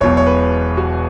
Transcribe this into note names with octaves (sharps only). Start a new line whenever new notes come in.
E1 E2 B2 F#3 C#5
C#5
B4
F#4